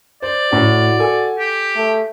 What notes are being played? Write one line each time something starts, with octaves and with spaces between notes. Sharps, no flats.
C5 D5
A2 F#4
A4 G#5
G4
A3